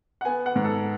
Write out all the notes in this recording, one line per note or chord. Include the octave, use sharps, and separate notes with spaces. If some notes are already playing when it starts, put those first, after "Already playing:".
F#5
B3 G#5
F#5
G#2
A4